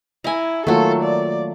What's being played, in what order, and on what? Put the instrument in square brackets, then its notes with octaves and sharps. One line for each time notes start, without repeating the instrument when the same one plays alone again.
[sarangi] E4 [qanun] G#5 A#5
[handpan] D#3 A#3 F4 [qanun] F#3 A3 [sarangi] A4
[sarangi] D5